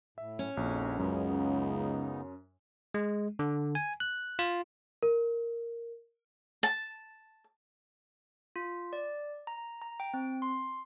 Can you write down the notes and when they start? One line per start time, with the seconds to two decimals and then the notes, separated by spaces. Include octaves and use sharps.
0.18 A2 E5
0.39 C#4
0.57 A#1 F2 D#3 F#4
0.99 C#2 F#2 C#3 B3 D#4
2.94 G#3
3.39 D3
3.75 G#5
4.00 F#6
4.39 F4
5.03 A#4
6.63 A5
8.56 F4
8.93 D5
9.47 A#5
9.82 A#5
10.00 G5
10.14 C4
10.42 C6